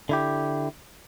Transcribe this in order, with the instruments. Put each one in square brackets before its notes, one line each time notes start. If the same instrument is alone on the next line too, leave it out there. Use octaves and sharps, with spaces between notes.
[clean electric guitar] D3 E4 G4